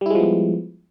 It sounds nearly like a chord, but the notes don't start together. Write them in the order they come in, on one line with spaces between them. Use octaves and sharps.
G3 E4 G#3 F3 B3